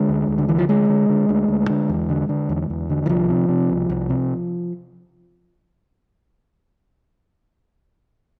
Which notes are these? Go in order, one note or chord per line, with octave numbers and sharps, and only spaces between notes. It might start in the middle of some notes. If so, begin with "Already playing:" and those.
Already playing: D3 G#3
D2
D2
D3
D3 E3
F3
D2 G#3
D3
D3
D2
D2
D3
E2
D3
D3
E2
E2
D3
E3
C2 F3
C3
C3
C2
C2
C3